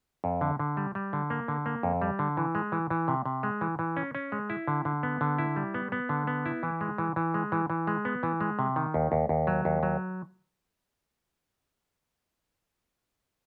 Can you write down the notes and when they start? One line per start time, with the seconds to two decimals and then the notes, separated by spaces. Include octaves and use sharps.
0.24 F2
0.41 D3
0.59 D3
0.77 G3
0.95 G3
1.13 D3
1.30 A#3
1.48 D3
1.66 A#3
1.83 F2
2.02 G3
2.19 D3
2.37 E3
2.55 G#3
2.72 E3
2.90 E3
3.08 C3
3.26 C3
3.43 G#3
3.61 E3
3.79 E3
3.97 C#4
4.15 C#4
4.32 G#3
4.50 E4
4.68 D3
4.85 D3
5.03 B3
5.21 D3
5.38 E4
5.56 G3
5.74 B3
5.92 B3
6.09 D3
6.27 B3
6.46 E4
6.63 E3
6.81 G#3
6.98 E3
7.16 E3
7.34 G#3
7.52 E3
7.70 E3
7.87 G#3
8.05 B3
8.23 E3
8.40 G#3
8.59 C3
8.76 D#3
8.94 D#2
9.12 D#2
9.29 D#2
9.47 F#3
9.65 D#2
9.83 F#3